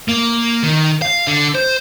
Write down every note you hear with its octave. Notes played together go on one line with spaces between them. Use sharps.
A#3
D#3
F5
D3
C5